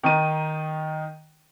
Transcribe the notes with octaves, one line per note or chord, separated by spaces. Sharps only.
D#3 D#4 D#7